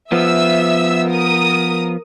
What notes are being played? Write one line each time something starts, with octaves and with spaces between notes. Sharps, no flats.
F3 B3 E5 E6
A#4 D#6